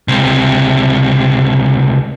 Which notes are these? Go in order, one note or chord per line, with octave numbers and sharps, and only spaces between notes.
C#2 C3